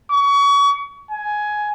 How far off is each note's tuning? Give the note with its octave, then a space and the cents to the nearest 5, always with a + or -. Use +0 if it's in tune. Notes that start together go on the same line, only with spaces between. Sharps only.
C#6 +30
G#5 +15